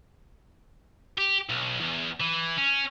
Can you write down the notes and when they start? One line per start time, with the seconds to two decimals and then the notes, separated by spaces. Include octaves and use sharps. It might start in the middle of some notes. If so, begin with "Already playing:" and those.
1.18 G4
1.49 B1
1.80 E2
2.20 E3
2.58 C#4